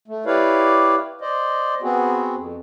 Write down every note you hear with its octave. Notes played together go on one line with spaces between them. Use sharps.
A3
E4 G4 B4 C#5 D5 F5
C5 D5 D#5
B3 C4 F#4 G#4
F2